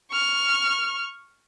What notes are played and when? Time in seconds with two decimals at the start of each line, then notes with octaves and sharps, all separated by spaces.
0.11 C#6 F6